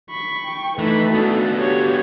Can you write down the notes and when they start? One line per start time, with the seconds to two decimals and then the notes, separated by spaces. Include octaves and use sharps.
0.10 B5 C#6
0.46 G5
0.78 E3 A3 D#4 B4 B5
1.15 B3 D4 F#4 A4
1.59 F#4 G4 C#5